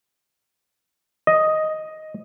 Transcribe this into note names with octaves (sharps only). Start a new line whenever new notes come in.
D#5